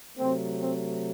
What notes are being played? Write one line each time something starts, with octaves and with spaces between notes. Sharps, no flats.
C3 F#3 A3 C4
C4